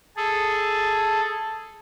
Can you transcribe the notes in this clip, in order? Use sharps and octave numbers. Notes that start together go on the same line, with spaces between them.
G#4 A4